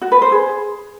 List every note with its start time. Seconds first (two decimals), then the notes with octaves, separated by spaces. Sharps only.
0.02 F#4
0.12 B4
0.22 C5
0.32 G#4